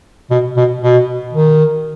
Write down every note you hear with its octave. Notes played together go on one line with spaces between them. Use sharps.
B2
B2
B2
D#3